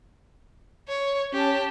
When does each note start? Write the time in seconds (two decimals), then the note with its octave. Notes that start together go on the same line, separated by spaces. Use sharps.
0.88 C#5
1.33 C#4 G4 A5